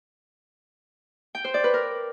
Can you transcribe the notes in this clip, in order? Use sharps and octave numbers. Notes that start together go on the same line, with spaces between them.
G5
C5
D5
B4
A#4